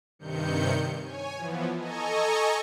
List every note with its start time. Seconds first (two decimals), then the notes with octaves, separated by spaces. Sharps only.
0.19 G2 C3 D#3 G6 C#7
1.03 C#5 G#5
1.37 E3 F3 B3
1.76 A4 D#5 G#5 A#5 C#6